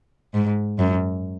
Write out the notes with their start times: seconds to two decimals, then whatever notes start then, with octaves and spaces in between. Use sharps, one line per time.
0.34 G#2
0.79 F#2